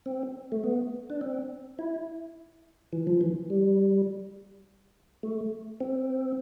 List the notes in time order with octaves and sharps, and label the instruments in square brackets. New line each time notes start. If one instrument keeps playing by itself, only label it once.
[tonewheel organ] C4
A3
B3
D4
C4
E4
E3
F3
E3
G3
A3
C4